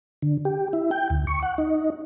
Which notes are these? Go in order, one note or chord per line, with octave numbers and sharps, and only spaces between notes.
D3
G4
E4
G5
D2
C#6
F#5
D#4